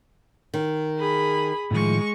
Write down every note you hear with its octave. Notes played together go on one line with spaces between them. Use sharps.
D#3
G#4 B5
A2 D#3 F3 G#3 C#6